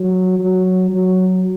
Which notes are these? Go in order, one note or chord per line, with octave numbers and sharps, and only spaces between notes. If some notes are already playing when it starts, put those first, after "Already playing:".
Already playing: F#3
F#3
F#3